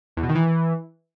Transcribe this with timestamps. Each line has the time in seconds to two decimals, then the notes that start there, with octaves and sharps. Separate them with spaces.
0.17 E2
0.23 B2
0.29 D#3
0.35 E3